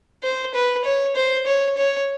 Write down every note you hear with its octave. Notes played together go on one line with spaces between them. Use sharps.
C5
B4
C#5
C5
C#5
C#5